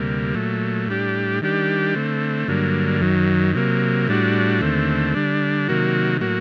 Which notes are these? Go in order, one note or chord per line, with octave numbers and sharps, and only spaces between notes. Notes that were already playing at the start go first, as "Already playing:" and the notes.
Already playing: D2 C3 G3 A#3
A#2 F#3 A3
A2 G3 D4 G4
D#3 G3 D4 G4
D3 A3 C4
G2 D3 F#3 A#3
F#2 D#3 F#3
C3 F#3 A#3
A2 G3 D4 F#4
D#2 D3 A3 C4
D3 G3 D4
C3 D#3 F#3 A#3 F#4
A2 F#3 A#3 F#4